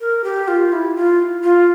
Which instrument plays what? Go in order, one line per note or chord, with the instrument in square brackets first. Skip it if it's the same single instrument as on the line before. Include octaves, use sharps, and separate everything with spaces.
[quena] A#4
G4
F4
E4
F4
F4